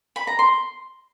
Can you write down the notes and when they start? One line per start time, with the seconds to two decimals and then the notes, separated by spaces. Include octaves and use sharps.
0.16 B5
0.27 A#5
0.39 C6